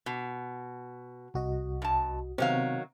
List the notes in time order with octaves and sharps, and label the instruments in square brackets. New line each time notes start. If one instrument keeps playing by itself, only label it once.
[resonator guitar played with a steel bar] B2
[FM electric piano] C2 F#4 D#5
[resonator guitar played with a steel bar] G2 A5
[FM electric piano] C3 B3 C4 [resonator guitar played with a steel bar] D#3 F#3 F5